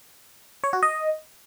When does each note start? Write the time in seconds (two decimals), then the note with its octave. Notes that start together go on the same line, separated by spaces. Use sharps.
0.64 C#5
0.73 F#4
0.83 D#5